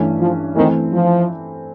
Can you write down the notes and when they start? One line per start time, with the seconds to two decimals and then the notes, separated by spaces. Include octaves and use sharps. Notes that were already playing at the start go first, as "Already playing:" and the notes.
Already playing: G2 E3 A3 C#4
0.19 F3
0.56 D#3 E3 A3 C4
0.93 F3